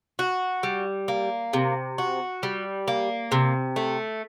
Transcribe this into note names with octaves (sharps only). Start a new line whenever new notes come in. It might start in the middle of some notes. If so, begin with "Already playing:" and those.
F#4
G3
A#3
C3
F#4
G3
A#3
C3
A3